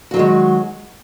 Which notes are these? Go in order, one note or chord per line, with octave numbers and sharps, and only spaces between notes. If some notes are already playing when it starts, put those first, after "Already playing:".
D#3 F#3 G#3 F#4